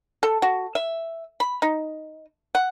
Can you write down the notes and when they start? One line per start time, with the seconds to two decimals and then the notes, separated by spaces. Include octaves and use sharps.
0.23 A4
0.42 F#4
0.75 E5
1.40 B5
1.62 D#4
2.55 F#5